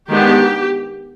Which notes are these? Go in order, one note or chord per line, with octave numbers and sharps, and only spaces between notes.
D#3 G#3 B3 D4 G4